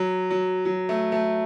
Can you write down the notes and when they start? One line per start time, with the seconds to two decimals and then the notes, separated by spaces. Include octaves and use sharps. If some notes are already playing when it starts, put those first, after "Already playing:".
Already playing: F#3
0.30 F#3
0.65 F#3
0.89 A3
1.12 A3